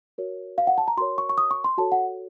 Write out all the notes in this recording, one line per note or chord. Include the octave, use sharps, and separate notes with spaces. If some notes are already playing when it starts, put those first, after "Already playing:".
F#4 A#4 C#5
F5
F#5
A5
A#5
F#4 A#4 C#5 C6
C#6
C#6
D#6
C#6
C6
F#4 A4 C#5 A5
F#5